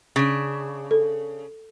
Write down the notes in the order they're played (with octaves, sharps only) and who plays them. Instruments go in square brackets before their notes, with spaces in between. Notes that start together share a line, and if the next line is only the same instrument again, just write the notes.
[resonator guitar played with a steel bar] C#3 D4
[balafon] A4